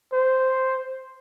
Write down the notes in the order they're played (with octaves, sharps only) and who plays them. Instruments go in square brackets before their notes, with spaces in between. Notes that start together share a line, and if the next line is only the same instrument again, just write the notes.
[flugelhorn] C5